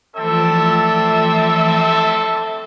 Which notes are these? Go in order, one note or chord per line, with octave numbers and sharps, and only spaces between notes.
E3 F3 G3 A3 C4 A4 E5